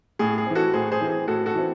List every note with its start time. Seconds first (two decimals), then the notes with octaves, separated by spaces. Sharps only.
0.19 A2 G#4
0.38 G#4
0.47 E3 C4
0.55 F#4 A4
0.74 A2 G#4 C5
0.92 G#4 C5
1.01 E3 C4
1.10 G#4
1.28 A2 F#4 A4
1.46 F#4 A4
1.55 E3 C4